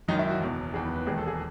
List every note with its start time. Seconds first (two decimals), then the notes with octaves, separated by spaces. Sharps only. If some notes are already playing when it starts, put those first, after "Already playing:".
0.08 F#1 F#2 D#3 D#4
0.19 E4
0.30 F#4
0.41 F#1 E2 B2
0.73 F#1 E2 D#3 G#4
0.85 B4
0.96 B4
1.06 E1 D#2 D#3 G#4
1.18 A4
1.28 G#4